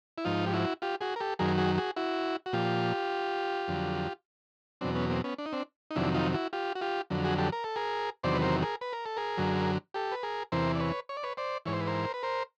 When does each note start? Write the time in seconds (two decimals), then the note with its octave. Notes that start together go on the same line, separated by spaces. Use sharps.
0.18 E4
0.25 G#2 F3 D#4 F4
0.46 G4
0.53 E4 F#4
0.82 F4 G4
1.01 F#4 G#4
1.16 A#4
1.20 G4 A4
1.39 F#2 D#3 F#3 G#4 A#4
1.58 F#4 G#4
1.78 F#4 G#4
1.96 E4 F#4
2.46 F#4
2.53 A#2 F3 F4 G4
3.68 F2 D3 F#3
4.81 E2 B2 F#3 C4 D4
4.95 B3 C#4
5.10 A#3 C4
5.24 B3 C#4
5.38 D4
5.46 D#4
5.53 C4 D4
5.91 D#4
5.96 F2 C3 D#3 F#3 D4 E4
6.14 D#4 F4
6.34 E4 F#4
6.53 F4 G4
6.75 F#4
6.81 F4 G4
7.10 F2 D3 F#3
7.24 F#4 G#4
7.38 G4 A4
7.52 A#4
7.64 A4
7.76 G#4 A#4
8.23 E2 C3 D#3 F#3 C5 D5
8.35 B4
8.42 A#4 C5
8.62 G#4 A#4
8.81 B4
8.93 A#4
9.06 A4
9.17 G#4 A#4
9.38 F#2 D3 F#3
9.94 G4 A4
10.12 B4
10.23 G#4 A#4
10.52 E2 C3 E3 A#4 C5
10.75 D5
10.80 B4 C#5
11.09 C#5
11.17 D5
11.23 B4 C#5
11.37 C5 D5
11.66 G#2 E3 C#5
11.73 C5
11.80 B4
11.87 A#4 C5
12.14 B4
12.23 A#4 C5